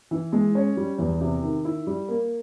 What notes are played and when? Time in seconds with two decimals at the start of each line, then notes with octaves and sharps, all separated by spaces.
0.11 E3
0.33 G#3
0.55 C#4
0.77 G3
0.98 E2
1.21 C3
1.43 D#3
1.65 E4
1.87 G3
2.08 A#3